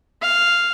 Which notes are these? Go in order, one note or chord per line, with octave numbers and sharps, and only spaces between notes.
F5